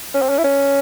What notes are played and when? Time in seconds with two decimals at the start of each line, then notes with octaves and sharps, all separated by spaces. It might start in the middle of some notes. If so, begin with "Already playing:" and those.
0.14 C#4
0.22 C4
0.29 C#4
0.38 E4
0.44 C#4